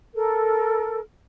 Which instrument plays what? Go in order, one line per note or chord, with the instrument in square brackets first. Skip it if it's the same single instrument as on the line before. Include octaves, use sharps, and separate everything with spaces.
[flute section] A4 A#4